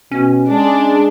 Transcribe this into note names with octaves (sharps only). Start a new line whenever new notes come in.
B2 C#4
G#3 D4 G#4